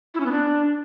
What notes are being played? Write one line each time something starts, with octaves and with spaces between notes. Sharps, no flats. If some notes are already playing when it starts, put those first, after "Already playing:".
E4
C#4
B3
D4